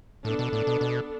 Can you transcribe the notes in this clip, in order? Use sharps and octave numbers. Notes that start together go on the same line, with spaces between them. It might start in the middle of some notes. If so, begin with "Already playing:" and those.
A2 B3 D4 A4
B2
A2
B2
B2